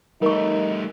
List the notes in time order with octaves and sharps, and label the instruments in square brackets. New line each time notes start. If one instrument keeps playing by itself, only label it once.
[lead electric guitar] G3 A3 [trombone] D#4 [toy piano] A#4 C#6